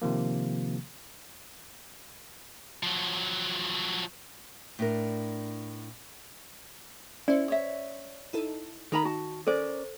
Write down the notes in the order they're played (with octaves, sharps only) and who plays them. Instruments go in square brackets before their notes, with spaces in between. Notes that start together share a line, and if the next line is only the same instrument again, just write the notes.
[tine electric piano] C3 D#3 F3 A#3
[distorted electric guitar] F3 F#3
[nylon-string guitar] A2 D4 A#4
[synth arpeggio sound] C#4 C5 [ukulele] E4 [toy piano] D5
[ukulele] C#5 E5
[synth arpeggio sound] D#4 E4 A4
[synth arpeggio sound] D#3 D#4 [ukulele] A#4 A#5 B5
[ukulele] F#4 A5
[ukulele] C#4 A#4 D5 [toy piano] A4 C5